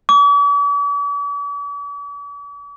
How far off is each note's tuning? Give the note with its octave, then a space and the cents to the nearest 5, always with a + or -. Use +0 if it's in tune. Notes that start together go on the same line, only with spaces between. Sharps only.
D6 -45